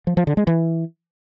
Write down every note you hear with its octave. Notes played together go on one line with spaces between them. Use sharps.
F3
F3
D3
G#3
E3